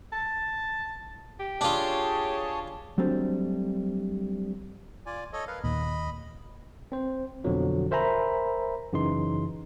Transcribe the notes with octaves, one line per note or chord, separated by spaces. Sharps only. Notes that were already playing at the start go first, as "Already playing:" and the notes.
A5
G4
D4 F4 G#4 C#5 A5
F#3 G3 A3 C4 D4
F4 D5 G#5
A4 C#5 D#5
A#4 B4 F5
D#2 A#2 D#5 B5
C4 C5
F2 B2 D3 F3 F#3
A#4 C5 E5 G#5 A#5 B5
F#2 C#3 E3 D#4 C6